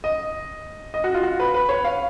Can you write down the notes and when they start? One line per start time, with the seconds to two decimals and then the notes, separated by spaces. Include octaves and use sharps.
0.04 D#5
0.94 D#5
1.04 F#4
1.14 F4
1.23 F#4
1.40 B4
1.54 B4
1.69 C#5
1.84 F5